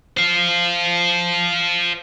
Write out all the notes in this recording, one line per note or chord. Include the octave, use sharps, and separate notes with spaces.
C5 F5